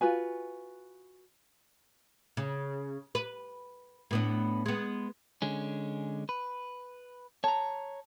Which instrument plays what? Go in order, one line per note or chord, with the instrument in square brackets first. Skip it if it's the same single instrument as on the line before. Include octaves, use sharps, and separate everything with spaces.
[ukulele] F4 F#4 B4 G#5
[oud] C#3
B4
A2 B3 D4
G#3 B3
[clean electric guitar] D3 G#3 C#4
B4
[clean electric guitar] C#5 A#5 [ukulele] A5